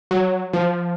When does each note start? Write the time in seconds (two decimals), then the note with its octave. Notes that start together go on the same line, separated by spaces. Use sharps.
0.11 F#3
0.53 F3